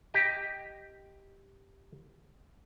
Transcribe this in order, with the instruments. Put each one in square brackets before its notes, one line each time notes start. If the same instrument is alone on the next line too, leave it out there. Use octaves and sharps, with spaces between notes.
[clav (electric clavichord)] G4 D#5